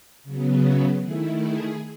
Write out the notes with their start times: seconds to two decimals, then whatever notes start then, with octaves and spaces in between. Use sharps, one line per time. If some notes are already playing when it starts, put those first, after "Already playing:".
0.24 C#3 F#3 B3
0.62 E5
1.01 D#3 A3 E4 G#4
1.38 G#4